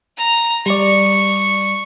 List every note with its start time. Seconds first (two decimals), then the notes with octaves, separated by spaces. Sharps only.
0.17 A#5
0.66 G3 D5 C#6